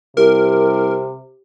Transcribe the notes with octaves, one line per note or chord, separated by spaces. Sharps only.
C2 C3 G4 A#4